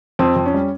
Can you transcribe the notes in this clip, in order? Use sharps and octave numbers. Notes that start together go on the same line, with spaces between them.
F2 C4
F2
C#4
G3